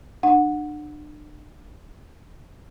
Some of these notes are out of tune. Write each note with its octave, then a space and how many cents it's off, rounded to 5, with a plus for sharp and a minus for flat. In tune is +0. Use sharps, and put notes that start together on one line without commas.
D4 +35 F#5 -15